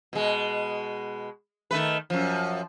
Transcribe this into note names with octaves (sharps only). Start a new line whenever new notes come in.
B2 G#3
D#3 A3 B4
F#2 F3